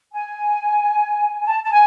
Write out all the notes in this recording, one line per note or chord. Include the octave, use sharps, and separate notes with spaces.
G#5
A5
A5
G#5